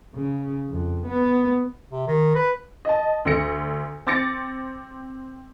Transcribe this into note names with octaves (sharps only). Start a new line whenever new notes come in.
C#3
F2
B3
C3
D#3
B4
D#5 A5
D2 D3 A#6 C#7
C4 D6 A6 A#6 C#7